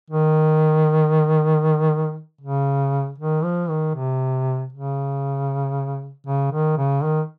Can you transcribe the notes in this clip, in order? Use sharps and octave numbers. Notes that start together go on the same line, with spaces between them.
D#3
C#3
D#3
F3
D#3
C3
C#3
C#3
D#3
C#3
D#3